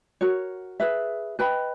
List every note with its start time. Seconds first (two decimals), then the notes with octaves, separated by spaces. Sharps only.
0.21 F#4 A#4 C#5
0.80 G#4 B4 E5
1.39 B4 D#5 G5 B5